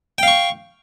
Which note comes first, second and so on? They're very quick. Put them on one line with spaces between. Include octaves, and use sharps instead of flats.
G5 F5 C#6